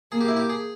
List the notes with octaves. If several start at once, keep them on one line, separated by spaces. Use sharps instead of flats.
A#3 G#4
G4
E4
G4
G#4